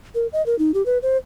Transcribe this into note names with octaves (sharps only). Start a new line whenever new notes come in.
A#4
D#5
A#4
D#4
G4
B4
C5